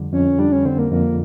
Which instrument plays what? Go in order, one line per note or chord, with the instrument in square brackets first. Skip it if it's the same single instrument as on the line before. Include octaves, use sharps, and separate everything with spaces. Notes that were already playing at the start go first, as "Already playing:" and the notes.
Already playing: [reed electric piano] F2 D3 G3
[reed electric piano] F2 [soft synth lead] C#4
[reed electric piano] G3 [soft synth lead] D4
[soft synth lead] C#4
[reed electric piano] D3 [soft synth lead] C4
[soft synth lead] A#3
[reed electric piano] F2 [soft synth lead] A#3